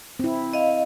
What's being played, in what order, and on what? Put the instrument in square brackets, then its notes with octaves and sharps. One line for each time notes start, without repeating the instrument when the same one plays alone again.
[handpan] C4 E4
[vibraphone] D#5 F5